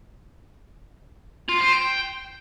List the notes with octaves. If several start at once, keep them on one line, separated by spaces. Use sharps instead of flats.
F4
C5
G5